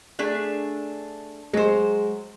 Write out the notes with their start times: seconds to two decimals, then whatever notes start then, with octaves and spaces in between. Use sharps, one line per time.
0.19 A3 D4 G#4
1.53 F#3 G#3 C5